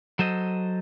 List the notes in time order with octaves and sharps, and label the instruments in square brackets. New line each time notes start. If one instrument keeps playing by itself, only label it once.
[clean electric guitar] F#3 A4 C5 D#5